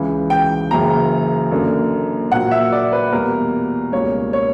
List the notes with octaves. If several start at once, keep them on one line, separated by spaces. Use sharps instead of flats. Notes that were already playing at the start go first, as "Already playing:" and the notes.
Already playing: C#2 C#3 E3
G5
F#1 F#2 C#3 E3 A#5
F#2 D3 A#3
A#1 A#2 F#3 A#3 F#5
E5
D5
B4
E2 B2 G3 A#3 A#4
C#2 B2 G3 A#3 C#5
C#5